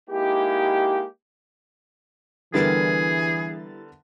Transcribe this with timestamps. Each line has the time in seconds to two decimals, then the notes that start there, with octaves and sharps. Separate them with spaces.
0.10 G#3 A#3 D#4 E4 G4
2.54 D3 E3 G3 B3 E4 G#4 A#4 A6